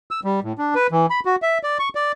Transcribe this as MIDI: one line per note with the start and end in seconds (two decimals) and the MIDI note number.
0.11 0.20 88
0.24 0.40 55
0.44 0.53 45
0.58 0.75 62
0.75 0.87 71
0.91 1.06 52
1.10 1.20 83
1.25 1.36 66
1.42 1.58 76
1.63 1.78 74
1.79 1.89 85
1.95 2.12 74